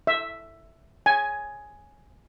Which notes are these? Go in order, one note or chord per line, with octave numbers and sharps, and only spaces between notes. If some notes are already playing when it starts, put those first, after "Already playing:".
E5
G#5